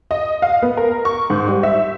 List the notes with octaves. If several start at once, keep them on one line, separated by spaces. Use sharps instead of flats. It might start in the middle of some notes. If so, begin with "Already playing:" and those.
D#5
F5
B3
A#4
C#6
G#2
G3
E5